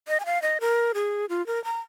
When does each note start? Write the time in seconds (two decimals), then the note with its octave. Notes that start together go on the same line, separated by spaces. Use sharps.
0.08 D#5
0.20 G#5
0.26 F5
0.42 D#5
0.61 A#4
0.94 G#4
1.29 F4
1.47 A#4
1.64 A#5